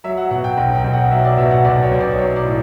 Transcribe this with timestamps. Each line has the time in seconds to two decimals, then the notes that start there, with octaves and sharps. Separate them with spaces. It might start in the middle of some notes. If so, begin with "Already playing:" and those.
0.04 F#3 E5
0.17 F#5
0.31 B2 F#5
0.44 G5
0.58 B1
0.76 G5
0.84 B1
0.93 F#5
1.11 F#3 E5
1.25 D5
1.38 B2 E5
1.51 F#5
1.65 B1 D5
1.83 C#5
1.92 B1
2.01 D5
2.18 F#3 C#5
2.36 D5
2.45 A2